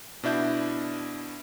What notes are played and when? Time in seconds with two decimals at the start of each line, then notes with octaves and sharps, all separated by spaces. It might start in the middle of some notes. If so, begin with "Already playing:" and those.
0.23 B2 D4 E4 G6